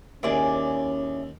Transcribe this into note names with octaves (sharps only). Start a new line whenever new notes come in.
D#2 C#4 E4 G#4 D5